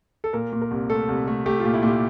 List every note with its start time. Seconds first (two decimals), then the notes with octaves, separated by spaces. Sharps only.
0.24 A4
0.33 A#2 A#4
0.53 A#2
0.62 A#4
0.71 C2
0.90 A3 A4
1.09 C2
1.27 A3
1.46 A3 G4
1.60 A#2 F4
1.74 E4
1.83 A#2
1.88 G4